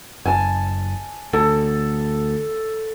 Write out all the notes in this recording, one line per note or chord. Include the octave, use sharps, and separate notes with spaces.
F#1 G#5 A5
D2 A4